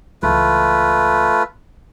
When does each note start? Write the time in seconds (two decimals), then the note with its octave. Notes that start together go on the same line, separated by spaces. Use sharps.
0.23 C#2 E3 A3 F4 B4